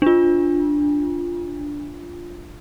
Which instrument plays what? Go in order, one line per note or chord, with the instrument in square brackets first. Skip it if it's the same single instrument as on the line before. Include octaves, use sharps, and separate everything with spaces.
[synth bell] D4 F4